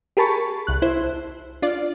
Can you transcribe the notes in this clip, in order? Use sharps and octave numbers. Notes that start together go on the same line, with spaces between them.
G4 G#4 A#4 A5 B5 C#6
C2 F#6
E4 C5
D4 F4 D5